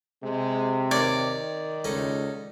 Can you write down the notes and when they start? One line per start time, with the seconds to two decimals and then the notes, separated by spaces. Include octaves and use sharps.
0.23 C3 G#3
0.91 D#3 A#4 C#5 D5
1.85 C#2 C#4 D#4 A4